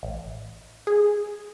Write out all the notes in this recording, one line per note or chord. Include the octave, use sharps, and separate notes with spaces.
A1
G#4